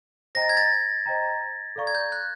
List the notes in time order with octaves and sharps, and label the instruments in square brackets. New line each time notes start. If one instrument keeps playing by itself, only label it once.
[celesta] C5 D#5 G5 A#5 [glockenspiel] A#6
[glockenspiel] A6
G#6
A6
[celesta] C5 D#5 G5 A#5
A4 D5 F5 A#5 C#6
[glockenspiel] G#6
G6
F#6